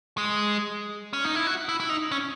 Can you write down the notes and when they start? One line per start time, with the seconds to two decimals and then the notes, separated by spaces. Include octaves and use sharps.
0.18 G#3
1.13 C#4
1.25 D#4
1.35 E4
1.46 F#4
1.69 E4
1.80 E4
1.89 D#4
2.12 C#4